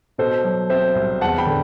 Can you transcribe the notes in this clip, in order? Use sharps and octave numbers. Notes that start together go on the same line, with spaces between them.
B2 A4 C5
F#3
C4 C5 E5
C2
E2 F#5 A5
G5 B5
D3